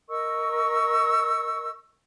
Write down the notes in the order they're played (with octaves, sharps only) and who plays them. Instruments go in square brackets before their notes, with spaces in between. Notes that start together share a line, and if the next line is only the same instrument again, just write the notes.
[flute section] A#4 D#5 C#6 E6